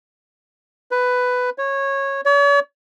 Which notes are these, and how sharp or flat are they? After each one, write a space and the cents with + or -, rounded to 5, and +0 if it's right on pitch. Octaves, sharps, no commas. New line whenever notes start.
B4 +10
C#5 -15
C#5 +45